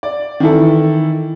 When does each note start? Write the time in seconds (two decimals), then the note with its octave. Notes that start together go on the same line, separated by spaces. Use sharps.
0.03 D5
0.40 D#3 E3 E4 A4